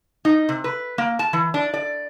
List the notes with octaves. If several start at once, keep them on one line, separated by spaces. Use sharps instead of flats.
D#4
C3
B4
A#3
A5
E3
D4
D5